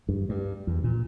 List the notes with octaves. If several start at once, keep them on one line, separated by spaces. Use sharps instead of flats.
G2
G2
E2
A#2